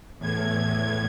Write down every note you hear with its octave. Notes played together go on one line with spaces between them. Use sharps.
E2 A2 G#6